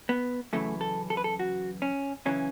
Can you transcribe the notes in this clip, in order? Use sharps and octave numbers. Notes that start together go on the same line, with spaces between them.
B3
F#2 C#3 E3 A3
A4
A4
B4
A4
F#4
C#4
F#2 C#3 E3 C#4